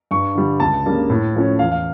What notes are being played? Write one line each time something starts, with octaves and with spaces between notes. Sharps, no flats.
G2 C#6
D3 G3
C#2 A5
C#3 G3 A#3 D4
A2
F3 A3 C#4
E2 F5
F5